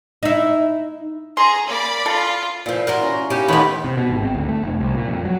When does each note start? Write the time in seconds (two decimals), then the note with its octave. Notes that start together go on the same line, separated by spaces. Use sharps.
0.23 D#4 E4
1.37 G#4 A#5 C6
1.67 A#3 D5 B5
2.06 F4 A4
2.66 A#2 E3 F3 A3
2.87 F4 F#4 A#4
3.00 E3 C#4
3.30 C#4 D#4 G4 F5 B5
3.48 D#2 A2 A#3 B3 E4 A4 B5
3.84 C3
3.98 B2
4.10 G#1
4.23 C4
4.35 D2
4.49 A3
4.64 F1
4.80 C2
4.95 A#2
5.08 F2
5.25 F#3